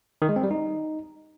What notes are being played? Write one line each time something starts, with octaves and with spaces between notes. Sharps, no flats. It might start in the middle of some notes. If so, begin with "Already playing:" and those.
D#3
G#3
C4
G3
D#4